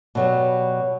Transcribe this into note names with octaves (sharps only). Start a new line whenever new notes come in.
B2 F#3 G3